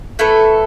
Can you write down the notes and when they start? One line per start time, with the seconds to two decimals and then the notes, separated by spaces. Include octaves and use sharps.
0.19 A3 E4 A4 B4